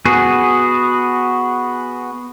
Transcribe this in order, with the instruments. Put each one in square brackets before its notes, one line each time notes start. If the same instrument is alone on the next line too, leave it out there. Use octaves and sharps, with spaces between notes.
[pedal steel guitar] B3 F#4 G#4